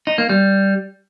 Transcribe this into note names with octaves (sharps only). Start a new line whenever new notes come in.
D#4
A#3
G3